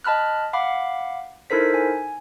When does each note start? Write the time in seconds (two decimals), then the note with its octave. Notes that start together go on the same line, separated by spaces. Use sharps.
0.04 D#5 A5 B5 F6 F#6
0.53 F5 F#5 B5 D6
1.50 D#4 E4 A4 A#4 C5 B6
1.74 G#5